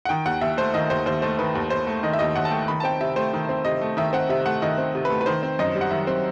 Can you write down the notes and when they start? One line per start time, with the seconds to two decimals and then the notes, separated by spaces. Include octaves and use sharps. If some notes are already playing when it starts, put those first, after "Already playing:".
0.05 F#5
0.09 D#3 G5
0.25 D#2 F#5
0.41 D#2 E5
0.57 A3 C5
0.74 D#3 D#5
0.90 D#2 C5
1.06 D#2 C5
1.22 A3 C5
1.39 D#3 B4
1.55 D#2
1.70 D#2 C5
1.87 A3
2.03 D#3 D#5
2.13 E5
2.19 D#2 D#5
2.36 D#2 F#5
2.45 A5
2.51 A3 G5
2.68 D#3 B5
2.80 A5
2.84 C4 G5
3.00 C3 E5
3.16 A3 C5
3.33 D#3
3.49 C4
3.65 C3 D#5
3.81 A3
3.97 D#3 E5
4.13 C4 F#5
4.29 C3 E5
4.46 A3 F#5
4.62 D#3 D#5
4.78 C4
4.95 C3
5.05 A3 B4
5.21 B4
5.26 D#3 C5
5.43 C4
5.59 F#2 D#5
5.75 G3
5.81 F#5
5.91 D#3 E5
6.07 C4